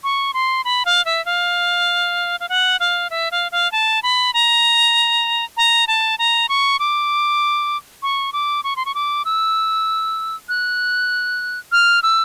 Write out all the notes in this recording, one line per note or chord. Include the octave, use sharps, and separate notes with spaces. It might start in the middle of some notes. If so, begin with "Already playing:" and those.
C#6
C6
B5
F5
E5
F5
F5
F#5
F5
E5
F5
F5
A5
B5
A#5
A#5
A5
A#5
C#6
D6
C#6
D6
C#6
C6
C#6
D6
E6
F#6
F6
E6